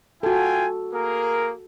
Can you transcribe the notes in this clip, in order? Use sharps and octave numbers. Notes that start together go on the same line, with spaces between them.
F4 F#4 A4 G5 G#5
A#3 G#4 A#4